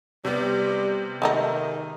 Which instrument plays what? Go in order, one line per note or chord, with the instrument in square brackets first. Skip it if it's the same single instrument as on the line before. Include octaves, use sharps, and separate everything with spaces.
[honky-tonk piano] C3 B3 [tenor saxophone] G3
[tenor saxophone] D#3 [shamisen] G#3 A3 D#4